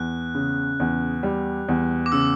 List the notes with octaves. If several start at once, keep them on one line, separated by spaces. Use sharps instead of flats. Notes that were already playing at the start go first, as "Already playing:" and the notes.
Already playing: E2 F#6
C#3
E2
G3
E2
D6
C#3 E6